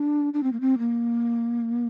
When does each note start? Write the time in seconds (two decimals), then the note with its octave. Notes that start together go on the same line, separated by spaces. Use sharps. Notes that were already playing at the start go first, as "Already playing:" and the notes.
Already playing: D4
0.33 D4
0.43 C4
0.52 A#3
0.60 C4
0.78 A#3